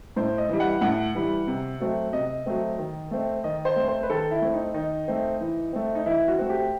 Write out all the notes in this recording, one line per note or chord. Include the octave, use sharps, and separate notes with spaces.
A2 C5
D#5
E3 G3
F#5
A2 F#5
E3 G3
C3
F#3 A3 C4
C3 D#5
F#3 A3 C4
D#3
A3 C4
D#3 D#5
C5
A3 C4
C5
B4
D#3 A4
E4
A3 C4
D#4
D#3 D#4
A3 C4
E3
A3 C4
D#4
E3 E4
F#4
A3 C4
G4